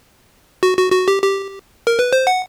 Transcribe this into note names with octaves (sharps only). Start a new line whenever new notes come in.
F#4
F#4
F#4
G4
G4
A#4
B4
C5
F#5